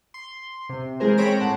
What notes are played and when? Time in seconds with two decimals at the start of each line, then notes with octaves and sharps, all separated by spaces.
0.14 C6
0.69 C3
1.00 E3 G#3 G#4 A#4 C5
1.18 C4 C5 C#5 B5 A#6 D7
1.41 A2 F#5 A5